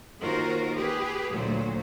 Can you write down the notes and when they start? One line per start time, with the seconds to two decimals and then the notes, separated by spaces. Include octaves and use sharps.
0.21 D#2 D#3 F4 F#4 A#4 C5
0.75 G4 G#4 B4
1.31 D2 A#2 F#3 A3 C5